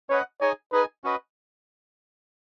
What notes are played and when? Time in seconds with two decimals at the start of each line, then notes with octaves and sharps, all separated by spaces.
0.09 C#4 B4 C#5 D#5 F#5
0.41 D#4 G#4 C#5 D#5 G#5
0.72 D#4 G#4 B4 D#5 G#5
1.04 C#4 F#4 B4 D#5